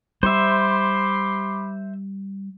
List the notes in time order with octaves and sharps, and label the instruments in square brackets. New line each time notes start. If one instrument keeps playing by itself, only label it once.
[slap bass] G3 [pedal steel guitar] C5 E5 [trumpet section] B5 C6 D6